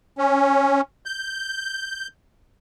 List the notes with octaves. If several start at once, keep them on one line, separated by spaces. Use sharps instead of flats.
C#4
G6